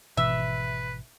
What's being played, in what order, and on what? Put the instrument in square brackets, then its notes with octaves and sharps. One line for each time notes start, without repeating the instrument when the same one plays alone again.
[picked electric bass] G#1 B2 E3 [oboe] B4 [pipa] E5